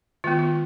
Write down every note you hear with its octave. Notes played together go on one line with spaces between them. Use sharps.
D#3 G#3 B3 F4
F4